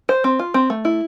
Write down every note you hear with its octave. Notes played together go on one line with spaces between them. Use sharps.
C5
C4
F4
C4
A3
E4